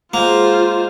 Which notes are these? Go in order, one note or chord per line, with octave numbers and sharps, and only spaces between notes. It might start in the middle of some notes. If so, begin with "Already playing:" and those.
G#3 A#3 F4 C5 F#5